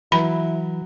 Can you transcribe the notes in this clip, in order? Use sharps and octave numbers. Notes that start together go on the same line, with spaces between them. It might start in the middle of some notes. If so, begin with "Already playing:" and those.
E3 F#3 E4 B5